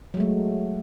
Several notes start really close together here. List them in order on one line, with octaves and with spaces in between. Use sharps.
F#3 G#3 A3